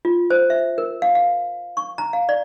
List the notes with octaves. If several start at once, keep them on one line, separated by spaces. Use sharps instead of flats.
F4
C5
E5
A#4
F5
F5
C#6
A#5
F5
D5